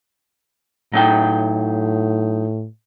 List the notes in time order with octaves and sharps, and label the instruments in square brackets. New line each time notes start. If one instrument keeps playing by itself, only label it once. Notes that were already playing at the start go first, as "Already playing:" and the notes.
[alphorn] A2 [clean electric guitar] F#3 D#4 G5